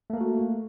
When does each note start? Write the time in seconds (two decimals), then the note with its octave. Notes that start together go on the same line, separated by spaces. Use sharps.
0.10 A3
0.13 A#3
0.17 A4
0.21 F#4